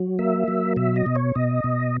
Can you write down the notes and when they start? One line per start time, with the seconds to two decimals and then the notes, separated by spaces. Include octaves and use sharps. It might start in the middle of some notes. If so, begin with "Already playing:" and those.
Already playing: F#3
0.19 A#3 E5
0.48 F#3
0.76 B2 E5
0.96 D#5
1.06 B2
1.16 C#5
1.35 B2 D#5
1.64 B2